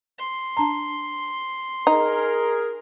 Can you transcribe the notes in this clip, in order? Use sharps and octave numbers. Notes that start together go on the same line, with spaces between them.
C6
D4 A5 A#5
D#4 G#4 A#4